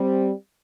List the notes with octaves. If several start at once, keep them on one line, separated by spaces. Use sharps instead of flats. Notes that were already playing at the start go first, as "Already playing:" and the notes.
Already playing: G3 C4